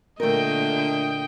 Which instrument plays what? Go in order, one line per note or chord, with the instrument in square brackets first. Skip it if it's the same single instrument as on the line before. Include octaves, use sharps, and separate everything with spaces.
[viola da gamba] A#2 D3 [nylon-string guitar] A3 A#4 [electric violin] D#5 G5